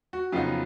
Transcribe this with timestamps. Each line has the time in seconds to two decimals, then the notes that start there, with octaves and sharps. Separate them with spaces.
0.13 F#4
0.32 F2 C#3 F#3 B3 D#4 F4